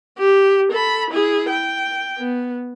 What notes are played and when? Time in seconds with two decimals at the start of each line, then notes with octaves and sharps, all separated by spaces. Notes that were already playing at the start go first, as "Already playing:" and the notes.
0.18 G4
0.71 A4 B5
1.10 E4 G#4
1.50 G5
2.17 B3